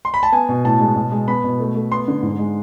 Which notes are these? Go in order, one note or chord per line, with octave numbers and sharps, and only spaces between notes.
C6
B5
A5
B3 G#5
B2
A2 A5
G#3
B2
G#3
B3 B5
B2
A3
A3
B3 C6
D3
G#2
G#3